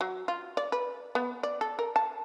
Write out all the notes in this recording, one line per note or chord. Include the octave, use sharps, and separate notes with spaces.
F#3
F4
D5
B4
B3
D5
A4
A#4
A5